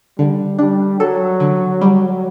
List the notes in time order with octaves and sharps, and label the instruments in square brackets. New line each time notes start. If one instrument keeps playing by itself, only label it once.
[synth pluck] D3 [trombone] G3
[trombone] G3 [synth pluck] D4
[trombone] F#3 [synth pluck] A4
[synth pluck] D3
G3